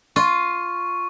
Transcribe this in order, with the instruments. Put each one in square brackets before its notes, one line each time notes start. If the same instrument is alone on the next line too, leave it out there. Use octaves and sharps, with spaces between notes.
[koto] F4 [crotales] C#6